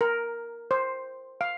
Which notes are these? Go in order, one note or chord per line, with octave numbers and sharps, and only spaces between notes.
A#4
C5
F5